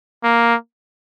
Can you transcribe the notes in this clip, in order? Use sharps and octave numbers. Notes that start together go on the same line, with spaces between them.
A#3